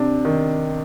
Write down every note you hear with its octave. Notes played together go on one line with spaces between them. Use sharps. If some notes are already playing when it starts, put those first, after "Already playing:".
Already playing: C3 D4
D#3